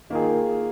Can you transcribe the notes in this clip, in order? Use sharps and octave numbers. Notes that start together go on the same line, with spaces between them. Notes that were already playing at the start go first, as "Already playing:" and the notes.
D#3 A#3 F4 G#4